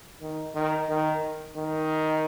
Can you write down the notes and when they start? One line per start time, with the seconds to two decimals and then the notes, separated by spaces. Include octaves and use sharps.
0.21 D#3
0.55 D#3
0.89 D#3
1.56 D#3